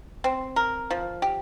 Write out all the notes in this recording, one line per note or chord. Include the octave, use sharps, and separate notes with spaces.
C4
A#4
F3
G4